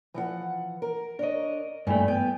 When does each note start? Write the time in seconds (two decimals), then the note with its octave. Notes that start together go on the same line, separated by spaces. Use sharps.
0.14 E3 F3 F#5
0.82 A#4
1.19 D4 A#4 C#5 D#5
1.87 G2 A#2 E3 G3 A3
2.08 B3 G5